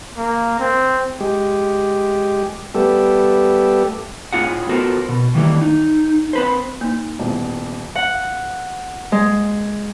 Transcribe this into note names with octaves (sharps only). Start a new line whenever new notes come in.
A#3
C4
G#3 G4
G3 A3 B3 G4 A4
A2 C4 F4 G#4 F#5
B3 F4 F#4 A4 A#4 C5
B2
D#3 E3 G3 A3 A#3
D#4
C4 B4 C5
A#3 D#4
D#1 E2
F#5
G#3